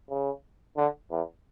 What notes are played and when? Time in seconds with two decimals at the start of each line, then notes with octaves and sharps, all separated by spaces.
0.10 C#3
0.77 D3
1.11 E2